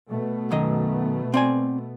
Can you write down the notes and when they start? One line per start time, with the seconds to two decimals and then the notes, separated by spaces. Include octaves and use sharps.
0.11 B2 A3 B3
0.51 F#2 D#3 D#5
1.34 C4 D5 G#5